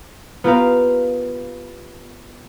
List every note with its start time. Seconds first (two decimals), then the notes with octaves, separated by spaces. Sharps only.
0.44 B3 F4 G4 A#4 F5